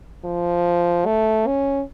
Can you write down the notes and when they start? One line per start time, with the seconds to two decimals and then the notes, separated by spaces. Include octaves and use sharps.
0.25 F3
1.06 A3
1.47 C#4